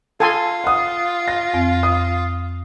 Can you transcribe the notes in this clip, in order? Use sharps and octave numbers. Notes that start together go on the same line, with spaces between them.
F4 A4 G#5 C6
F#5 D#6
A#6
F2 C4
D#6